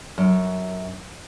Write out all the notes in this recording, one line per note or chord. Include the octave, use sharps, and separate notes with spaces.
F#2